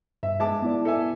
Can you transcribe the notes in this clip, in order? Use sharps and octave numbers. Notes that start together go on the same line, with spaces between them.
G2 E5
G#3 E5 A5 D6
B3 E4 D5
A4 E5 G#5